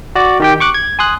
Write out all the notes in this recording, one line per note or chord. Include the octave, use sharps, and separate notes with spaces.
F#4 D5
D#3 G4 G5
C#6 D6 F#6
G#6
G#5 C6 D#6 F#6